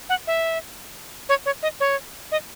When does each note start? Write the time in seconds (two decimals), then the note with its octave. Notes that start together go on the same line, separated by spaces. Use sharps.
0.09 F#5
0.27 E5
1.29 C#5
1.46 C#5
1.63 D#5
1.80 C#5
2.32 D#5